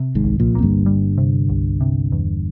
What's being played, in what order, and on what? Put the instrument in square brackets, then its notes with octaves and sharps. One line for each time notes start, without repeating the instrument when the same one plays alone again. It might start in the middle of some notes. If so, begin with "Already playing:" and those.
Already playing: [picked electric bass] C3
[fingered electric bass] G#1 G#2
[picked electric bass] C2
[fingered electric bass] A#1 A#2
[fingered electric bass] F2 [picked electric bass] A#3
[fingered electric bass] G1 G2
[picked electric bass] G3
C3
C2
C3
E2